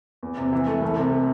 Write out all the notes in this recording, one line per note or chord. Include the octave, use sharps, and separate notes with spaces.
E2
C3
E3
A3
C2
C3